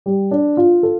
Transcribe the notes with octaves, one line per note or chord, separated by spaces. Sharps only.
G3
D4
F4
A4